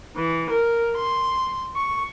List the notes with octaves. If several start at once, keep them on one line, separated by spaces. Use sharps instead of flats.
E3
A#4
C6
C#6